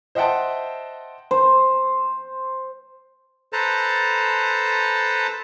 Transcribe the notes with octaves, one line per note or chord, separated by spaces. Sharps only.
C5 D#5 E5 F#5 G5 A5
C5
A4 B4 C5 A5 A#5